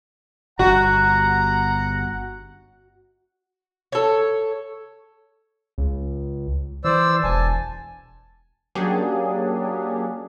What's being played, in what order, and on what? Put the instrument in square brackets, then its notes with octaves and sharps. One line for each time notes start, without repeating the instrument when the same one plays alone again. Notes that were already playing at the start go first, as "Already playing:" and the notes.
[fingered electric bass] G1 [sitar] F#4 [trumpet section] F#5 [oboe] A#5
[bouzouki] A4 C#5
[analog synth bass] C#2
[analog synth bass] E3 [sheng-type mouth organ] C5 D5 E6
[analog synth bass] E1 [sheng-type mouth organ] G#5 A5
[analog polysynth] F#3 A#3 C#4 D4 G4 G#4